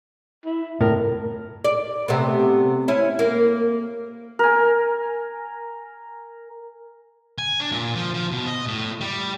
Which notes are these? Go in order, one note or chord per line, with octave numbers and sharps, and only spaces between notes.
E4
A2 A#4
D5
C3 A3 B3
C#4 E4
A#3
A#4 G#5
G#5
D4
A#2
F3
F3
B2
D#5
A2
G3